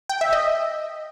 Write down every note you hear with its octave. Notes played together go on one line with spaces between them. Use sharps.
G5
E5
D#5